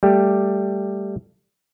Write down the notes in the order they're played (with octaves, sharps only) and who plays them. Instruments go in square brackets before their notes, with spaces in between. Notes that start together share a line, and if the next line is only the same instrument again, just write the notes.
[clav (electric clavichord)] G3 A3 G4